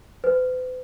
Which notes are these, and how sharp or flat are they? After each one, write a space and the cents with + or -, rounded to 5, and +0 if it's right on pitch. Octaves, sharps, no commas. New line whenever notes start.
B4 +45